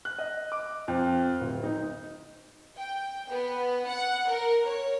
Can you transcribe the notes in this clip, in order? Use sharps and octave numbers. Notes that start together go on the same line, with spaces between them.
F#6
D#5
D6
F2
D1
D#4
G5
B3
F#5
A#4
C#5